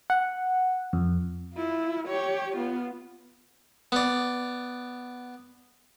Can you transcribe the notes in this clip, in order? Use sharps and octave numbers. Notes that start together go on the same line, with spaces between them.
F#5
F2
E4 F4
G4 C#5
B3 F4
B3 D5